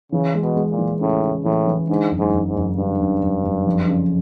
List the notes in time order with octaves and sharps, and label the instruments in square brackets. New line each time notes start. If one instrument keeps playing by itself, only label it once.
[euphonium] C#3 [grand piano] E3
[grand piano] G#3
[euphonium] B2
[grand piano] G#3
[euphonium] A#2
[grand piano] E3
[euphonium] A2 [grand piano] C#3
[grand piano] C#3
[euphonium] A2 [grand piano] E3
[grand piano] E3
[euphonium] G#2 [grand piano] D3
[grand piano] F#1
[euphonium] G#2
[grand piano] F#1
[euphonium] G#2
[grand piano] F#1
[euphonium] G2 [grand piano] D3
[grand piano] F#1
F#1
F#1
F2
C#3